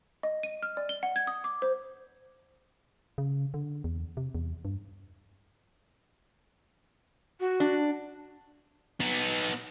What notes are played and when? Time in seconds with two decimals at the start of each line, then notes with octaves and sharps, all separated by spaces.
0.23 D#5
0.43 D#7
0.62 F6
0.77 D5
0.89 G7
1.03 F#5
1.16 G#6
1.27 D#6
1.44 D6
1.62 C5
3.18 C#3
3.54 D3
3.84 E2
4.17 C3
4.35 E2
4.65 G2
7.40 F#4
7.60 D4
9.00 B3 D#4